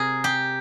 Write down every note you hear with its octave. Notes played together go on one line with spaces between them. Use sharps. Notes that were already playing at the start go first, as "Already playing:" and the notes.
Already playing: C3 G#4 A#4
G4